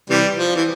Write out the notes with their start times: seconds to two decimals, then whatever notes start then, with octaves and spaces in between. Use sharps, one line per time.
0.10 C3 E3 G3
0.37 F3
0.55 E3